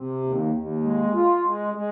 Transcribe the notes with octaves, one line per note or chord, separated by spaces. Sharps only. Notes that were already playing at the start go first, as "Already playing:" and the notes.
Already playing: C3
D#2
D#2
G#3
F4
G#3
G#3